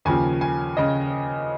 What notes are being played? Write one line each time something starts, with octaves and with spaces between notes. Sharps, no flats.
D#2 C#3 F3 G#5
G#5
C#3 D#5